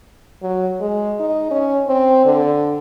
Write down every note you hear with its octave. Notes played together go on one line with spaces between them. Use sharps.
F#3
G#3
D#4
C#4
C4
D3